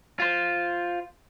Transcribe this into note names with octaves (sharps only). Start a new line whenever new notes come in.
F4 C5